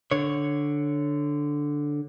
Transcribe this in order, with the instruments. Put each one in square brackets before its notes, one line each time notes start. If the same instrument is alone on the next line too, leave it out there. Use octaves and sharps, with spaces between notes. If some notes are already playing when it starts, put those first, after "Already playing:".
[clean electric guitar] D3 C#5